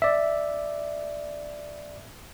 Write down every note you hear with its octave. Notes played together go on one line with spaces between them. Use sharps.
D5 E5